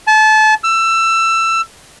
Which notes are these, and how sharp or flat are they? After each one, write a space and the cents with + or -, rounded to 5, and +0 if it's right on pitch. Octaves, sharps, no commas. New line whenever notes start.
A5 -30
E6 +20